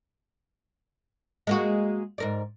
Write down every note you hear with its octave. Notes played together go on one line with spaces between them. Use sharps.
G#3 A#3 F#4
G#2 A#4 D5